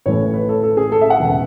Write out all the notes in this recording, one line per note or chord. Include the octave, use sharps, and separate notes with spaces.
A1 A2 E3 A3 C#5
B4
A4
A4
G#4
A4
E5
F#5
E1 C#3 E3